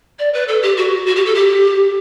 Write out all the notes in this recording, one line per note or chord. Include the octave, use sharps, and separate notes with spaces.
D5
B4
A4
G4
F#4
F#4
G4
A4
G4